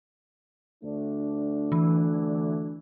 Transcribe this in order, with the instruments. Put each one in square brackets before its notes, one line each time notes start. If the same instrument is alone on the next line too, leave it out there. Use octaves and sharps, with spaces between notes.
[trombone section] D2 A3 D4
[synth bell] E3